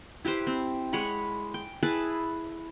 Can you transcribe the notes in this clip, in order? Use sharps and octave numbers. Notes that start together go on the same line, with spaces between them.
E4 G4 B4 C5
C4
G#3 C#5 F#5 B5
G5
E4 G#4 B4 A5